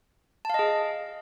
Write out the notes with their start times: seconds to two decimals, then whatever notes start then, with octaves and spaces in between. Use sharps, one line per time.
0.45 A5
0.50 F5
0.54 D#5
0.59 G#4